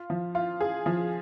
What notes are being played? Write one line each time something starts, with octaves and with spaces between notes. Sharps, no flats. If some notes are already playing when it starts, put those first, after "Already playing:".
Already playing: F4
F3
F4
G#4
F3